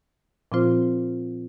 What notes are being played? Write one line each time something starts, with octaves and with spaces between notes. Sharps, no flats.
A#2 F3 C4 F4 C5